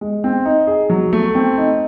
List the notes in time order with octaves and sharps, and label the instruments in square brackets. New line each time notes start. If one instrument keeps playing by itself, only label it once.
[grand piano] G#3
C4
D#4
G#4
F#3
A3
C4
D#4